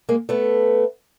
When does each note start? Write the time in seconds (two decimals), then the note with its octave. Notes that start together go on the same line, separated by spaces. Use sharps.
0.09 G#3 A#3
0.29 A3 B3